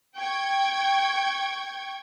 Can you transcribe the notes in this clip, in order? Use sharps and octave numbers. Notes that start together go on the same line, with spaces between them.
G5 C#6 G#6